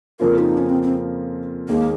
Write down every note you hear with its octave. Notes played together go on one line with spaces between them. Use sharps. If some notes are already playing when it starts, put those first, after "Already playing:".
F2 C#3 F3 A#3 F4 A#4
D#4
C#4
C4
C4
D#2 D#3 G#3 A#3 D#4 G#4